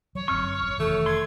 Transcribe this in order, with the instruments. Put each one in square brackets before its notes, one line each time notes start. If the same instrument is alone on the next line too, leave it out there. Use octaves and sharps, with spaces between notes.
[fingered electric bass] F#3 [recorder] C#5
[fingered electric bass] G1 F#2 C4 [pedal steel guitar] C#6 F6
[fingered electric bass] A#1 F#2
[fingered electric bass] F1 D#3 E3 [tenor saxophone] A3
[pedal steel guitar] C6 [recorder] G#6